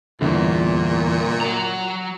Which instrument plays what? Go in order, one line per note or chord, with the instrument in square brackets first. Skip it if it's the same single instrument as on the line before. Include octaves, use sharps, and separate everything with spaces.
[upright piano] G1 [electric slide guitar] E2 [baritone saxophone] A#2
[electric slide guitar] F#3 A#5